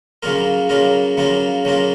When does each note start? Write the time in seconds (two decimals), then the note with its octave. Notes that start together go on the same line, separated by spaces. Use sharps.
0.23 C#3 F#3 A#3 F4 A#4
0.69 C#3 F#3 A#3 F4 A#4
1.17 C#3 F#3 A#3 F4 A#4
1.65 C#3 F#3 A#3 F4 A#4